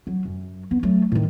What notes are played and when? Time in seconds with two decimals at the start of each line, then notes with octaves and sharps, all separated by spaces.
0.07 F#3
0.25 F#2
0.71 B3
0.83 F#3 A3
1.12 A2 D#3